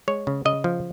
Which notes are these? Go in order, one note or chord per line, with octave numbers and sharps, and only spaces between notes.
G#3 C#5
C#3
C#3 D#5
F3